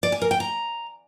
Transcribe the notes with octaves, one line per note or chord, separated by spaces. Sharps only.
D5
G#5
A#4
G5
A#5